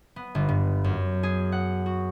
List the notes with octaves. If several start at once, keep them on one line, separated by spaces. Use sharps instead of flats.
B3
G1
G2
F#2
G#4
F#5
F#4